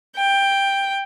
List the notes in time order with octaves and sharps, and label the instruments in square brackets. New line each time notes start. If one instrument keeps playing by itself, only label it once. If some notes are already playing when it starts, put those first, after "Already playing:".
[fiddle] G5